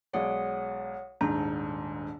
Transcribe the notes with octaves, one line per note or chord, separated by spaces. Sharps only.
B1 G#3 C#5 D5 F#5 D#6
D#1 G#2 D4 A#5